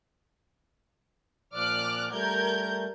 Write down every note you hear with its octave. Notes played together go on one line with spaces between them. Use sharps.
A#2 F3 D5 D6 F6 F#6
G3 A3 A#4 G6 G#6